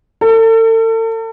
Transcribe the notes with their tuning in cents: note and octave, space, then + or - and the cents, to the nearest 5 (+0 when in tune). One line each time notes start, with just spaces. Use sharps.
A4 +40